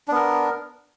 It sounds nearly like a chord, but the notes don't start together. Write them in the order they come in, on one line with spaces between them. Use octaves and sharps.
D4 B3 A#4